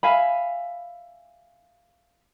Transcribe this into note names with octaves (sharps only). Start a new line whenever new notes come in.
E5 F5 G#5 B5